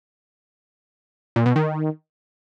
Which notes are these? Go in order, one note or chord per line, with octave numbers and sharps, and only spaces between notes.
A#2
B2
D#3